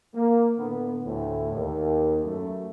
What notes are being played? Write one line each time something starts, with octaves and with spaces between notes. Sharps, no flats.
A#3
A2 D3 B3
D2 A2
D#2
F#2 A3